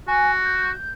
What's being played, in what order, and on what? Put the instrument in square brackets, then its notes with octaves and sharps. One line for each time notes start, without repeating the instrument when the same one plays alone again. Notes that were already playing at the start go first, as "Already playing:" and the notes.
[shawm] F#4 [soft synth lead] G#5
[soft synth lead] G6